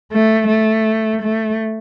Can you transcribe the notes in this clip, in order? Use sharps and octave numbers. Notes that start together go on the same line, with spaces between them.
A3
A3
A3